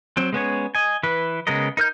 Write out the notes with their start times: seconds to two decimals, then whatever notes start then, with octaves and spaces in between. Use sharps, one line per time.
0.17 F#3 C4
0.33 G#3 B3 C#4 C#5
0.75 D#5 G#5
1.03 E3 B4
1.47 C#3 G#3 B3 A#4 D#5
1.77 D#4 A#4 F6 G6